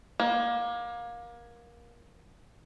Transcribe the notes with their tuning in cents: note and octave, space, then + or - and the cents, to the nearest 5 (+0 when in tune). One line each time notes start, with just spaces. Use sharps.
A#3 +25